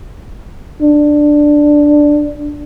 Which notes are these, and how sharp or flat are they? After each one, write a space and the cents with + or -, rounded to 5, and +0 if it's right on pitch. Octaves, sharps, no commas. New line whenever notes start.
D4 +5